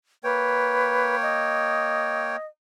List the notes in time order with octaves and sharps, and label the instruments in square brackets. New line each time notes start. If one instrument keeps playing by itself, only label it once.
[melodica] A#3 C#5 G5 [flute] B4
[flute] D#5